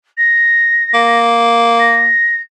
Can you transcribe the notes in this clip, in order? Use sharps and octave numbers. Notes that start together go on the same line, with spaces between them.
A#6
A#3
A#6